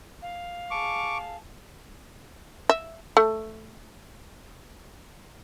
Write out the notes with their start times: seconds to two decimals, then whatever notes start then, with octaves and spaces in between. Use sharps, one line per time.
0.22 F5
0.71 G#4 A5 C#6 D6
2.69 E5
3.17 A3